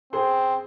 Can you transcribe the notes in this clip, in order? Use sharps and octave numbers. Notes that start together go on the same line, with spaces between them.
C4 G#4 C5